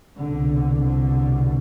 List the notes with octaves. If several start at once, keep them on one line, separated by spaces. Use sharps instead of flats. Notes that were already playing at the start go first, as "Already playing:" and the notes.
C2 B2 D3
D3